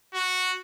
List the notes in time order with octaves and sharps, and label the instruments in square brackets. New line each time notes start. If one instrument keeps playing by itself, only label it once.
[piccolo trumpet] F#4